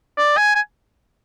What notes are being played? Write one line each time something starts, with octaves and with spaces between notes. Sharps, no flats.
D5
G#5
G#5